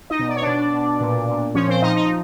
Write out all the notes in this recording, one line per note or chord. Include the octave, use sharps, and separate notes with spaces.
D#4 D#5
B2
D5
C#5
B2 D4 D5
B2
A#2
A#2
F3 C#4 C#5
C4 C5
F3 D#4 D#5
D#4 D#5